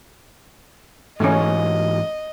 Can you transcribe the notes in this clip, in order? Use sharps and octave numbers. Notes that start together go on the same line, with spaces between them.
G#2 E3 A3 C#4 D#5